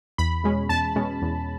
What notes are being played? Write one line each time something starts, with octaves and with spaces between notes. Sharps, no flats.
E2 B5
B2 G#3 C#4
E2 A5
B2 G#3 C#4
E2